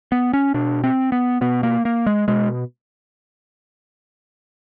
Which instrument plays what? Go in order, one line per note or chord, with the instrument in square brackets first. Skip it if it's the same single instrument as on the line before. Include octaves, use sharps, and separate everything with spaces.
[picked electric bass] B3
C#4
B2 D4
C4
B3
B2 B3
A#3
A#3
G#3
B2 G#3